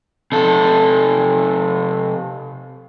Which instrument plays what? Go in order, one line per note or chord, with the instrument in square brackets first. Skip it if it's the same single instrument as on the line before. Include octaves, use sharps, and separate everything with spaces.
[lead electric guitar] C3 A4